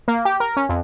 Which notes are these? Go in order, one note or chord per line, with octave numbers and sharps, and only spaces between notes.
A#3
G4
A#4
C#4
F2